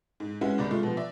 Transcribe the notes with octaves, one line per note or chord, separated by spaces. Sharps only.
G#2
G#3 C#4 E4 F#4 B4
G1 C2 D5 B5
G#3 A3 F4
B2 F3
D5 E5